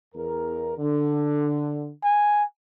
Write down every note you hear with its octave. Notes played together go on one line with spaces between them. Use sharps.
E2 A#4
D3
G#5